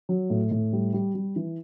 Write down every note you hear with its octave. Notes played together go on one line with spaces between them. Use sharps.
F#3
A2
A2
G3
G3
G3
E3